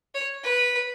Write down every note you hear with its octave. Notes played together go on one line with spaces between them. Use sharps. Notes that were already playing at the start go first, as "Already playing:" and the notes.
C#5
B4